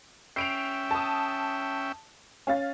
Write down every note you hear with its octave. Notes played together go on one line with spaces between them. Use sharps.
C#4 E5 G5 C7 D7 F7
A5 D#6
C#4 F5 A6